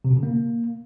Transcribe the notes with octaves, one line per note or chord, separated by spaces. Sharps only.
C3
B2
C#3
A#3